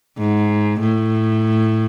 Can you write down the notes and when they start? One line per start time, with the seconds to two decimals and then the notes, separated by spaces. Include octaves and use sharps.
0.18 G#2
0.80 A2